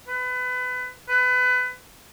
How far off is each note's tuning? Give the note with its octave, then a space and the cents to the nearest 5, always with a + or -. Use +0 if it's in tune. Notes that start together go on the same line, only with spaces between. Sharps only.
B4 +25
B4 +25